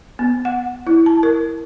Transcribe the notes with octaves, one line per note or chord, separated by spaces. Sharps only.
B3
F#5
E4
A5
A#4